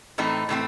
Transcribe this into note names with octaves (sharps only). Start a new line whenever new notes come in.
A2 E3 A3 C4 D#4
A2 E3 A3 C4